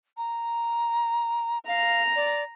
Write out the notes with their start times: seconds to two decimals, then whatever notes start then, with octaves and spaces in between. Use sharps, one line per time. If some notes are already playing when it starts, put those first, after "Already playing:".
0.17 A#5
1.68 F5 A#5
2.16 D5